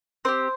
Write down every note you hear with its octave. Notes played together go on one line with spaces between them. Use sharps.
C4 G4 C5